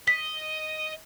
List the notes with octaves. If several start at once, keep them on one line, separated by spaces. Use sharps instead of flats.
D#5 B6